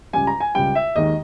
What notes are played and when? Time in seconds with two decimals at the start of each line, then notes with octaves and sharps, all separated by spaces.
0.13 C#2 C#3 G3 G#5
0.27 A#5
0.40 G#5
0.55 C#2 C#3 G3 G5
0.75 E5
0.96 D#2 D#3 G#3 D#5